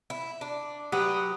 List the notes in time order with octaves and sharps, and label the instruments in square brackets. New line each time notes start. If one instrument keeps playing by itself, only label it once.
[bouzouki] E4
D4
[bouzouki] F#3 [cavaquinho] G4 B4 F#5 [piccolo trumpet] D#6